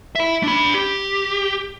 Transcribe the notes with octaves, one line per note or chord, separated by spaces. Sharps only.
E5 B5
D4 B5
G4